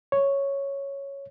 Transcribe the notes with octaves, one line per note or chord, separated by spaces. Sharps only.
C#5